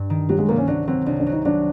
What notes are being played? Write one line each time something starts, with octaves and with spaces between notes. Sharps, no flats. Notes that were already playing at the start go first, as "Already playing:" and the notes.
Already playing: G2
D#3
F#3 G3
G#3
C2 A#3
C#4
F#3 D4
F#3 C4
C2 D4
D4
F#3
D#4
F#3 D4